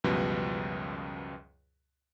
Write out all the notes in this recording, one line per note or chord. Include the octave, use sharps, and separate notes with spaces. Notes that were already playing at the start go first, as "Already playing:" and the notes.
C#2 F#2 B2 F3 G3 B4